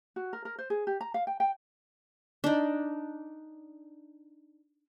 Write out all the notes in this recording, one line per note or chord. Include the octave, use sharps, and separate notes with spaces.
F#4
A#4
A#4
C5
G#4
G4
A#5
F5
G5
G5
D4 D#4